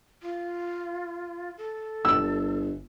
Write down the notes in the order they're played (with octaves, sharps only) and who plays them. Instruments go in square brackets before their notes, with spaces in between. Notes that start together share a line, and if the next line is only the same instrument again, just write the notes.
[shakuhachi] F4
A4
[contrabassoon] G1 [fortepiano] E6